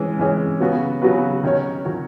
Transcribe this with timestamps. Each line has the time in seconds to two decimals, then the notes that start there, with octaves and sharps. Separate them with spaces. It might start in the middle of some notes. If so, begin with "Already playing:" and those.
Already playing: E3 G#3 C#4 G#4
0.19 E3 G#3 C#4 G#4
0.60 C#3 F#3 B3 F#4 B4
1.02 C#3 F#3 B3 F#4 B4
1.43 D#3 F#3 C#4 F#4 C#5
1.85 D#3 F#3 C#4 F#4 C#5